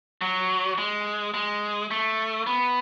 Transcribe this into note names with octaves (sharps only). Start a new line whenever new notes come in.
F#3
G#3
G#3
A3
B3